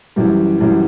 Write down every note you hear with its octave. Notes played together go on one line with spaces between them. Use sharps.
F#2 E3 G3
F#2 E3 G3